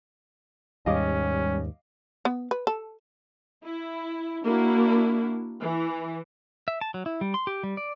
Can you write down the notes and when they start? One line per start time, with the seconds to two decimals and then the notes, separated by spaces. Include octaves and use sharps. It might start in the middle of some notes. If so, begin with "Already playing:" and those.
0.86 D#2 G#2 G3 C#4 D#5 F5 D6
2.25 B3
2.51 B4
2.67 A4
3.64 E4
4.44 A#3 D4 E4 F#4
5.62 E3
6.68 E5
6.81 A5
6.94 F#3
7.06 E4
7.21 G3
7.34 C6
7.47 G4
7.63 G3
7.77 D5